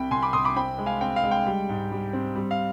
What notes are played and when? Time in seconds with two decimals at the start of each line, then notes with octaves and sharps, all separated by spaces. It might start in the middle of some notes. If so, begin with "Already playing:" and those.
Already playing: C2 C3 G5 B5
0.11 C2 G#5 C6
0.22 B5 D6
0.33 C2 C6 D#6
0.45 B5 D6
0.56 C4 G5 B5
0.78 G#3
0.86 F5 G#5
1.01 C4 G5
1.16 F5
1.23 G#3
1.31 G5
1.46 G3
1.69 G#2
1.92 G3
2.13 C4
2.36 G3
2.51 F5